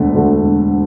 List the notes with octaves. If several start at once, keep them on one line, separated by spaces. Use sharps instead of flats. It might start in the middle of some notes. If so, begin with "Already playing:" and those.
Already playing: E1 D2 D3 A3
D2 D3 A3
E1